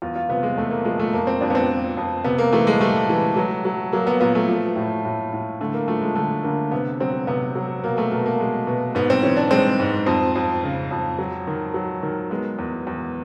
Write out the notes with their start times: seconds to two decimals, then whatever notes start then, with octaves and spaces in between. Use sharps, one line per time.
0.02 E2 F4
0.15 F4
0.29 C3 B3
0.43 G#3
0.58 E2 A3
0.71 A#3
0.85 F3 G#3
0.99 A3
1.13 F2 A#3
1.27 C4
1.41 F2 D4
1.50 B3
1.55 C4
1.69 F3
1.97 F2
2.24 C3 B3
2.38 A#3
2.53 E3 A3
2.67 G#3
2.81 G3 A3
3.09 E3
3.36 F#3
3.65 F#3
3.92 F#3 A#3
4.07 B3
4.21 A#2 B3
4.35 A3
4.48 F3
4.76 A2
5.05 A2
5.33 A2
5.60 D3 A3
5.74 A#3
5.88 F3 A3
6.01 G#3
6.15 D3 A3
6.43 D3 A#3
6.71 C3 B3
7.00 F#3 C4
7.27 C3 B3
7.55 F#3
7.84 B2 A#3
7.98 A3
8.11 B2 A#3
8.26 A#3
8.40 G#3
8.67 B2
8.95 G#2 B3
9.10 C4
9.23 E3 C#4
9.37 D4
9.51 G#3 C4
9.80 G#2
10.06 F2 C4
10.36 F2
10.64 C#3
10.91 F2
11.19 F#3
11.47 D#3
11.74 F#3
12.02 D#3
12.30 G#3 B3
12.59 E2
12.87 E2